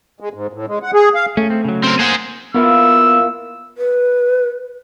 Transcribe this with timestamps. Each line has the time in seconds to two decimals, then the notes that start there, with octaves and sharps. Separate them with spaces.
0.20 G#3
0.34 G#2
0.53 A2
0.68 G#3
0.83 F#5
0.94 G#4
1.15 F5
1.37 A3 C#4
1.50 C4
1.64 C#3 F#3
1.84 C4 A#4
1.99 A#3 G#4 C5 F#5
2.54 A#3 B3 E4 F4 E6
3.78 B4